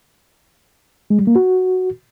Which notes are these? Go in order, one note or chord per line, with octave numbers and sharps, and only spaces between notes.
G#3
G3
A#3
F#4